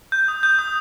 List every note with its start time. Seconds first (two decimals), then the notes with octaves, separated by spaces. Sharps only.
0.12 G6
0.28 D#6
0.43 G6
0.59 D#6